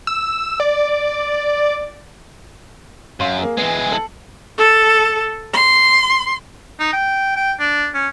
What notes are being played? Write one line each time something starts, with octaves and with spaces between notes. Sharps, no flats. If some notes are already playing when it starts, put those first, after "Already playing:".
E6
D5
F#2 F5 C6
A#3 G#4
E3 G#3 B3 C7
A4 F#7
A4
C6
D#4
G5
G5
D4
C#4